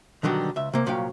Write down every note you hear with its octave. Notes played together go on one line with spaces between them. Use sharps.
B2 D3 D#3 F#3 G3
C#2 E5
C3 A#3
C2 A#2 F#3 C#4 F5 G5